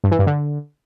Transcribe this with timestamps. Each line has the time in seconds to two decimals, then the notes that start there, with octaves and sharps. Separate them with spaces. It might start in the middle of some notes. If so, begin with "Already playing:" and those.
0.04 G2
0.11 E3
0.19 G2
0.27 D3